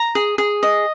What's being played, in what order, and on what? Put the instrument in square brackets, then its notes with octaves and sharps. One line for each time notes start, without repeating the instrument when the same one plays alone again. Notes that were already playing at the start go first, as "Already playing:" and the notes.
Already playing: [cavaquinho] A#5
G#4
G#4
D#5